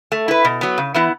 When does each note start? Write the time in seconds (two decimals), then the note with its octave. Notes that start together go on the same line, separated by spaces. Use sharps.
0.12 A3
0.28 E4 B4
0.45 B2
0.61 F#3 B3
0.78 C#3
0.94 E3 B3 E4